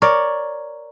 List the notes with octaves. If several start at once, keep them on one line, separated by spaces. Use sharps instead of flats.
A#4 C#5 D5